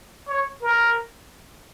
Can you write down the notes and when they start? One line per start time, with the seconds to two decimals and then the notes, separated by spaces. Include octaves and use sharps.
0.28 C#5
0.62 A#4